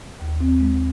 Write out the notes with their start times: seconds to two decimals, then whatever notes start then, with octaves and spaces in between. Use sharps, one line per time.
0.20 D#2
0.40 C4
0.60 G#3